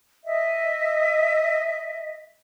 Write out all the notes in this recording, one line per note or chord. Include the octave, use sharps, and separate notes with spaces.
D#5 E5